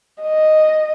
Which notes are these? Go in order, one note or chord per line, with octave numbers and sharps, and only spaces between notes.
D#5